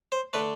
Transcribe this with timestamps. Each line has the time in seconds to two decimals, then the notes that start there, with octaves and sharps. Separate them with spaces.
0.12 C5
0.33 D3 A3 B4